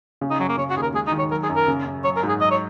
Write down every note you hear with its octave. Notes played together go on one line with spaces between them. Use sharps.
C#3
D#4
F#2 F#3
A#3
C#3 C#5
F#4
D#2 G#4
A#4
G#3 G#4
D#4
D#3
C#5
F#3 A#4
G#4
F#2
A#4
C#3
F#2
F#3 C#5
A#4
G#2
G#4
F#3 D#5
C#5